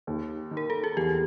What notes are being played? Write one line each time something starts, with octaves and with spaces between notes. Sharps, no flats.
D#2
D#3
A#4
A4
G#4
E2 G4